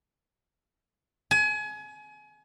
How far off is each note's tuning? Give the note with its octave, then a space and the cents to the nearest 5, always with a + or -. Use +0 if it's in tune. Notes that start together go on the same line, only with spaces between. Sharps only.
G#5 +30